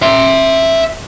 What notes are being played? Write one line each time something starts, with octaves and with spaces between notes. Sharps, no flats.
E5 C6